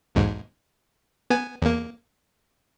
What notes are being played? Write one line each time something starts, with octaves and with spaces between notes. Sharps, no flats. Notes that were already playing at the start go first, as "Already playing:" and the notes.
B1 E2 G#2
B3 G#5
E2 A#3